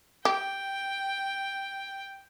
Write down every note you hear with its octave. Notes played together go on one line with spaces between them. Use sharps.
G4 G5